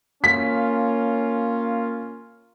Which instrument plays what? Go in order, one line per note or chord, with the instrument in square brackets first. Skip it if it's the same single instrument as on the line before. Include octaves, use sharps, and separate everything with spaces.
[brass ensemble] A#3 C#4 F4 [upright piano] B6